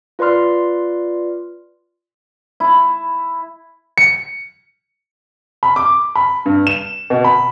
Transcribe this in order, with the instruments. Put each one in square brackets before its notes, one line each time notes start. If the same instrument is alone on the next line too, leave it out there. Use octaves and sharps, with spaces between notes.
[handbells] F4 B4 D5 C6 F6
[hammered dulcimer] E4
[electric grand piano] C#7
[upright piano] B5
D6
B5
G2
E7
B2
B5